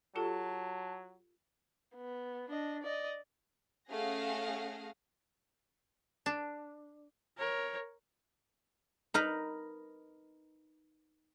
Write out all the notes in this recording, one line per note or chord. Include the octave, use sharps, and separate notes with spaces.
F#3 F4 G4 A4 A5
B3
D4 D#5
D5 D#5
A3 C#4 G#4 F5 F#5 A#6
D4
A#4 C#5
D#4 A#4 B4